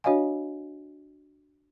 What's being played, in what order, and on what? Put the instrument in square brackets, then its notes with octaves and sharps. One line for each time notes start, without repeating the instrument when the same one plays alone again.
[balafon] D4 F#4 C#5 D#5 F5 G#5